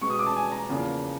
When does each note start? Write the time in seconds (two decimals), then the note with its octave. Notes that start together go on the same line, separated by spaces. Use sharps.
0.02 B2 G#3 B3 C#6
0.10 D#6
0.19 D6
0.26 A5
0.36 G#5
0.52 A#5
0.69 E2 C#3 F3 A#3